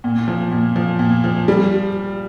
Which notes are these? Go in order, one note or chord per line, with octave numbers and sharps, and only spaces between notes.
A#2
F3
A#2
F3
A#2
F3
G3